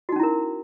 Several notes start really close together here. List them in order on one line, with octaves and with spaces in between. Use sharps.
F#4 D#4 C#4 E4 A#4